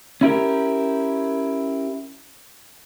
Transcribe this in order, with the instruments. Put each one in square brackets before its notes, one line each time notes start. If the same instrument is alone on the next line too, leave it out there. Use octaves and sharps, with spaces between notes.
[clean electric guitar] C#4 E4 G4 A#4